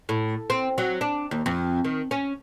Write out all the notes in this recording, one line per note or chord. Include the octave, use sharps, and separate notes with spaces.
A2
C4
F#3
D4
D#2
F2
D#3
C#4